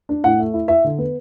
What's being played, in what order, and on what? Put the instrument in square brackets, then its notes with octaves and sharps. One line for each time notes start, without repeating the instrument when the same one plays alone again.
[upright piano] D4
A2 F#5
A3
E4
E4 E5
D3
B3